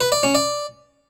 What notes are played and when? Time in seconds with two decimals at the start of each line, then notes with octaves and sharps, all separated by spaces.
0.01 B4
0.12 D5
0.23 C#4
0.35 D5